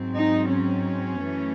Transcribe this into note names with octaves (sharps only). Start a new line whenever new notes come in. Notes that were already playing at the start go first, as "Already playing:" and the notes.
Already playing: G#2 F#3 C4
D#4
C#4
F#2 E3 A3